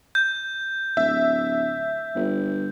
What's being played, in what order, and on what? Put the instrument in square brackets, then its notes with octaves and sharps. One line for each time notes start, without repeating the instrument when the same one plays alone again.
[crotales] G6
[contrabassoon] D1 [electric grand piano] E5
[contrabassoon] G1